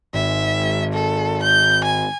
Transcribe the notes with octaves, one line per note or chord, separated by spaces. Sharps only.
G#1 E5
A4
G6
G#5